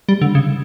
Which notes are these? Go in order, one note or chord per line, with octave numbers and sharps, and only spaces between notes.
G3
D3
C#3